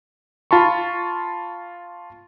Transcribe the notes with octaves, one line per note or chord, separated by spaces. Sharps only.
F4 A5 B5 C#6